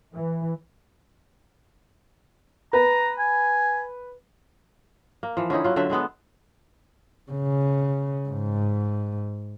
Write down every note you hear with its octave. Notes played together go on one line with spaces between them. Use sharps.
E3
B4 A#5
G#5
A#3
E3 F3
D3 C#4 D#4 E4
F#3 F4
D3 F#3 A4 E5
D3 G#3 B3 A4
C#3
G#2